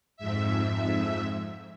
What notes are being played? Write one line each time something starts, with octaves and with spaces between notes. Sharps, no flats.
F2 G#2 E5